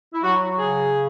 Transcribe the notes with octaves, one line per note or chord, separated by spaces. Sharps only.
E4
F#3 F#4
C#3 G#4